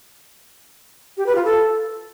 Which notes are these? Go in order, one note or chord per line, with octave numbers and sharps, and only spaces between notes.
G4
B4
F4
A4